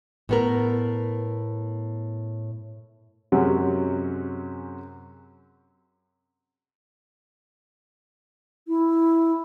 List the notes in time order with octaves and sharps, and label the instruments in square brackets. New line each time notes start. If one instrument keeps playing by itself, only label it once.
[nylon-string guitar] A2 B3 A#4
[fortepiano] F#2 C3 F#3 G#3 C#4
[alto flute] E4